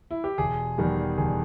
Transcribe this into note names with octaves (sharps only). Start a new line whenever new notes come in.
E4
G4
E1 G#4
E2 D#3 G3
E1 G#4